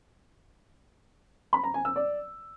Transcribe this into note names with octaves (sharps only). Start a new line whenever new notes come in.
B5
A#5
G#5
E6
D5